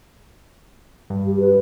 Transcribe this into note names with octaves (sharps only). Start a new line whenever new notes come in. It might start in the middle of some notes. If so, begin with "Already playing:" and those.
G2
G4
B4